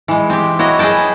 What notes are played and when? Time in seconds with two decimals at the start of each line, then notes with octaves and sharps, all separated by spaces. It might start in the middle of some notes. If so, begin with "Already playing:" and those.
0.08 E3 G#3
0.30 C4 G4
0.59 E4 F#4 C#5 D#5
0.79 G#4 B4 D#5 G5 A5